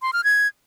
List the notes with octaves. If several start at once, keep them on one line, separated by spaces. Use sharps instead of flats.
C6
F6
G#6